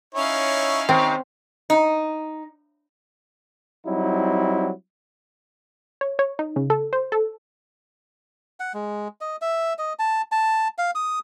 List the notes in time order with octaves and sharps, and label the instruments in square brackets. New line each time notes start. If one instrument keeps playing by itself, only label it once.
[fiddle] C#4 F5 [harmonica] D#4 E4 C#5
[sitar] C3 D#3 [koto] C4
[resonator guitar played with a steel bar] D#4
[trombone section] F#3 G3 C4 D#4 E4
[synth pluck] C#5
C#5
D#4
C#3
A4
C5
A4
[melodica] F#5
G#3
D#5
E5
D#5
A5
A5
F5
D#6